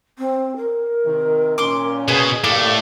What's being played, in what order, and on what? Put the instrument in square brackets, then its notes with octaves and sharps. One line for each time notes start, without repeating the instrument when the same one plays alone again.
[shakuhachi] C4
A#4
[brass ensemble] C3 D#3
[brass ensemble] A#2 C#4 [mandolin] C6 D6
[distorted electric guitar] B2 [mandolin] G#4
[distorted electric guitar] A2 A3 [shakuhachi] A#3 [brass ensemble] G4 A4 F5 [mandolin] D5